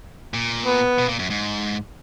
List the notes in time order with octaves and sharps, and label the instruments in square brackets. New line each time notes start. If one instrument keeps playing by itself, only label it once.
[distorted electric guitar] A#2
[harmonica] B3
[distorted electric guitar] B2
A#2
F#2
G#2